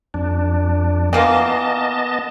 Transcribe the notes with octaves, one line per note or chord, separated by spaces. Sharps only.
F2 D4
E3 A#3 B3 F4 D#5 A5